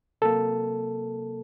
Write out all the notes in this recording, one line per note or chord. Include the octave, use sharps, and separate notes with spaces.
C3 F#3 A#3 A4